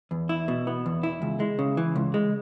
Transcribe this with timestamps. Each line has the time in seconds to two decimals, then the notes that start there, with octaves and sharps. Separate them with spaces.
0.11 E2
0.29 E4
0.48 B2
0.67 B3
0.86 E2
1.03 E4
1.22 C#2
1.40 G#3
1.59 C#3
1.77 E3
1.96 C#2
2.14 G#3